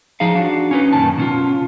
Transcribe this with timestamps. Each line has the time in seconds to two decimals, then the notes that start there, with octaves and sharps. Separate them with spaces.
0.20 F3 D#4 G#4 F5
0.35 D4 F#4
0.71 C#4 D#4 B4
0.93 F#2 A#2 D#3 A5
1.17 B2 C#4 F4